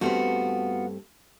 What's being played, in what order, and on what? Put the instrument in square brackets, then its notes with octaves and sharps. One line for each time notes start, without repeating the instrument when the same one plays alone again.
[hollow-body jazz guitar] G2 A3 C4 [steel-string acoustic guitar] B3 F4 F#4